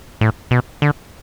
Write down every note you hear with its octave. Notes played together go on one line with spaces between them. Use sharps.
A2
B2
D3